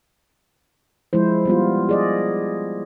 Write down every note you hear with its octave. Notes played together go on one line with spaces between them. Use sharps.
F3 G#3 E4 C5
G3 B3 F4
G#4 D5 D#5